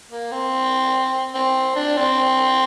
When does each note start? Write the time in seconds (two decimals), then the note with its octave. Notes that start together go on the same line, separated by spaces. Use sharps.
0.11 A#3
0.32 C4
1.34 C4
1.76 D4
1.97 C4